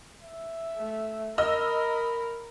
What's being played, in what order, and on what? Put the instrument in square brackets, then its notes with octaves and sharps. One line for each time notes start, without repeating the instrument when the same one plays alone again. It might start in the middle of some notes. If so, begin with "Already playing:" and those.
[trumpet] E5
[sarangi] A3
[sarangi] A#4 [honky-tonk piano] D#5 E6 F6 [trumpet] B5